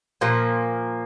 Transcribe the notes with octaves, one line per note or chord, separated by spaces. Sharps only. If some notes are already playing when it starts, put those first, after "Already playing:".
A#2 F3 A#3